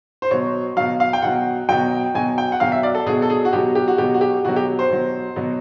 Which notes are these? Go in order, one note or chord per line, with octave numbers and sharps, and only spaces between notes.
C5
B2 F#3 C#5
B2 F#3 F5
F5
G5
B2 F#3 F#5
B2 F#3 G5
B2 F#3 G#5
G5
F#5
B2 F#3 F5
E5
D5
A4
B2 F#3 G#4
A4
G#4
F#4
B2 F#3 G4
G4
F#4
B2 F#3 G4
F#4
G4
B2 F#3 F#4
G4
C5
B2 F#3
B2 F#3